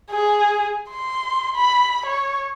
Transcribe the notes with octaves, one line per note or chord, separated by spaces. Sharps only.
G#4
C6
B5
C#5